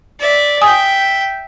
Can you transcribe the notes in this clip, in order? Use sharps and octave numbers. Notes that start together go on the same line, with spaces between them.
D5 E5
E5 G5 G#5 D#6